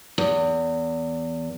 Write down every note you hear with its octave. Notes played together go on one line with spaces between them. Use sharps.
E2